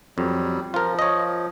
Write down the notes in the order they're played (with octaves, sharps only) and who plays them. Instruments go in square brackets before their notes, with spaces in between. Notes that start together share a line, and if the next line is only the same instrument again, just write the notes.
[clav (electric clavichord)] F2 [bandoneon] F#3 G3
[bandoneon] F3 [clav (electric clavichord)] F4 A#4
[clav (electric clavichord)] C#5 D#5